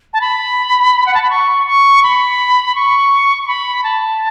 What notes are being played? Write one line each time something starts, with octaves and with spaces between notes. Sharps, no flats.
A5
B5
F#5
A5
B5
C#6
C#6
B5
C#6
C#6
B5
A5